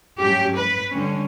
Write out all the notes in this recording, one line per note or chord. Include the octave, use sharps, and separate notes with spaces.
G2 F#3 C#4 G4
B4
D3 G3 C#4